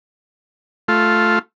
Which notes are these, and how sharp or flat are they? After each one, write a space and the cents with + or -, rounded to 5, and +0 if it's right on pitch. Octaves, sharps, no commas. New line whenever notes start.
A3 -5 F4 +0